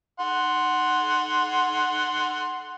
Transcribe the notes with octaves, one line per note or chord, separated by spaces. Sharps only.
F#5 C6